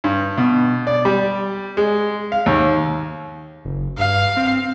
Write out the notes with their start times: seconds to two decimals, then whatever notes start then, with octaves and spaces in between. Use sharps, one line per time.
0.04 G2
0.37 B2
0.87 D5
1.05 G3
1.77 G#3
2.32 F5
2.46 D#2
3.65 F#1
3.98 G2 F5
4.37 C4